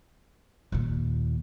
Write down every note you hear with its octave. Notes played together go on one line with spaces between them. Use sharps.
D#2 A#2